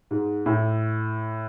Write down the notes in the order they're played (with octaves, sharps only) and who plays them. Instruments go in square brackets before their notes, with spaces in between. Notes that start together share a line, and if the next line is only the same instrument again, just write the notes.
[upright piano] G#2
A2